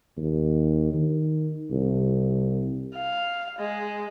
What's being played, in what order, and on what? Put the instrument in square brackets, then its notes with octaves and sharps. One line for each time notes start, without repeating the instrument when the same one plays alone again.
[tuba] D#2
D#3
C2
[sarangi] F5
G#3